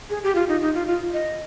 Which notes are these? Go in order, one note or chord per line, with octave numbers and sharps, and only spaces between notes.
G#4
G4
F4
D#4
D#4
F4
F4
D#5